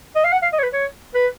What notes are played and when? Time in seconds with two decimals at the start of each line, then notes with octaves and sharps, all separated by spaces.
0.16 D#5
0.24 F5
0.32 F#5
0.42 F5
0.53 D#5
0.59 C#5
0.63 B4
0.73 C#5
1.14 B4